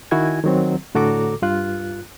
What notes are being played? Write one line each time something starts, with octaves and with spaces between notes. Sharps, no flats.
D#3 E4 F#4 G#5 G#6
D#3 F#3 C4
A2 D3 F#4 A4 A#5 D6
G2 F4 F#6